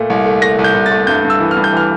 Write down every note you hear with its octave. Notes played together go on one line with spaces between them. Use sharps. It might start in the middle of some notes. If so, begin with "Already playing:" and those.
Already playing: A#2 A3
C2
A3
A3 A#6
C2
G6
C2
A6
A3
G2 G6
G2
E6
E3
F6
G2
G6
E3 F6